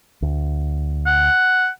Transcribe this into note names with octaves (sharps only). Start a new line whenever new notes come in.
D2
F#5